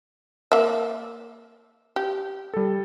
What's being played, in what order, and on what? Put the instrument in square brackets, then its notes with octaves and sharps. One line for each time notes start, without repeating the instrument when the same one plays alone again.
[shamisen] A#3 E5
G4
[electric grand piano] G3 A4